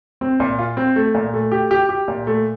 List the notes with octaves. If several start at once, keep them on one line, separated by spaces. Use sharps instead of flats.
C4
A#2
F4
C4
A3
A#2
A3
G4
G4
G4
A#2
A3